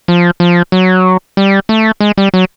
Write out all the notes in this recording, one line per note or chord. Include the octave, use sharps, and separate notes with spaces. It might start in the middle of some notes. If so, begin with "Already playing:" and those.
F3
F3
F#3
G3
A3
G#3
G3
F#3